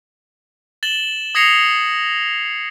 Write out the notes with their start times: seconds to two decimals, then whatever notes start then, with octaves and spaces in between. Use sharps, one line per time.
0.83 A6 E7 F#7 G7
1.35 D#6 G#6 A#6 C7 C#7 F7